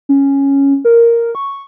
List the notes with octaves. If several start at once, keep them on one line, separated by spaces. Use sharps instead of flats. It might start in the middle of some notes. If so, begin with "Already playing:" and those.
C#4
A#4
C#6